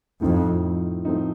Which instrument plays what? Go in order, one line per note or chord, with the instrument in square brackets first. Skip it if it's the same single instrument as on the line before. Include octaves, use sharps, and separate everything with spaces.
[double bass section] F2 [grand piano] A2 F3 C4 D#4
[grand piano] A2 F3 C4 D#4